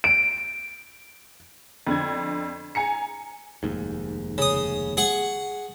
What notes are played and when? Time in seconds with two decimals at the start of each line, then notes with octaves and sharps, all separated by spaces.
0.04 D7
1.87 F2 D3 G#6
2.75 G#5 A#5 C#7
3.63 F1 D#2 G#2
4.38 C#3 D#6
4.97 G#4 F#5 C#6